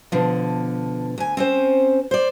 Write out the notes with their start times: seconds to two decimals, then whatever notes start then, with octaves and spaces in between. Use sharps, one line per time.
0.12 B2 D3 F3
1.18 D2 G#5
1.37 C4 C#4 C5
2.11 C5 D5